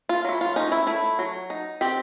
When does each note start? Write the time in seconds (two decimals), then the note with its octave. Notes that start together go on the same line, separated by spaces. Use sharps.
0.09 F4
0.25 F#3 E4
0.41 F4
0.56 C#4 D#4
0.72 E4
0.87 A3 E4
1.19 F#3
1.50 D#4
1.81 C4 G4